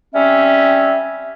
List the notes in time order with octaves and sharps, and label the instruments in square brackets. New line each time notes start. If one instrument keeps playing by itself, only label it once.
[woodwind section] G3 C4 C#4 E5